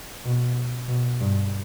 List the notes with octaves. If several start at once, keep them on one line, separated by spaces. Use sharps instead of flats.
B2
B2
G2